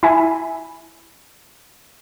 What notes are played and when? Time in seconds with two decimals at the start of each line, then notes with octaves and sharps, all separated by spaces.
0.03 E4 E5 G#5